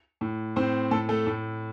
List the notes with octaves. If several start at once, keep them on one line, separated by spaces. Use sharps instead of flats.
A2
A2 C4 C5
A2 A3 A4
A3 A4
A2